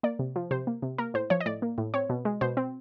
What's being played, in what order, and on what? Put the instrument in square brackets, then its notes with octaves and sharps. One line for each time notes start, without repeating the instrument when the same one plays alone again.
[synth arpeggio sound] A#3 D5
C3
F3
C3 C5
A#3
C3
A#3 A#4
A2 C5
F3 C#5
D#5
A2 D5
A#3
A2
C4 C#5
B2
G#3
B2 C5
C4